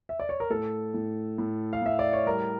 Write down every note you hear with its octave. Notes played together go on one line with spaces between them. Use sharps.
E5
D5
C#5
A#4
A2 A4
A2
A2
F5
A2 E5
D5
C#5
G3 A#4